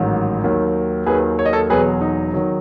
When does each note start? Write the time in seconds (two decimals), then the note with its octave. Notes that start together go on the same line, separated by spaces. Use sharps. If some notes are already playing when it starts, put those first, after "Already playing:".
Already playing: A1 G#2 D#3 F#3
0.44 D#2 D#3 F#3
1.06 D#2 D#3 F#3 G#4 B4
1.39 C#5
1.45 D#5
1.53 A4 C#5
1.70 E1 E2 B2 F#3 G#4 B4
2.01 D#4
2.34 D#3 F#3